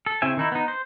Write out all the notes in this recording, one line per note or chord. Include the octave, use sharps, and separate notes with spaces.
A4
C#3 C4 E4 E5 G#5
D#3 D#4 E4
B3 D#4
C5